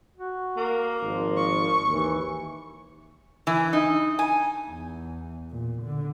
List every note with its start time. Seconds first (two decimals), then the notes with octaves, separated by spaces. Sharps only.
0.17 F#4
0.57 A#3
1.02 G#1 F3
1.37 C#6
1.88 D#2 E3
3.47 E3
3.73 D#4
4.19 G#5
4.70 E2
5.50 A#2
5.82 D3